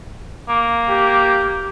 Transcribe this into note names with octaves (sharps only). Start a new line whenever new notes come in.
A#3
G4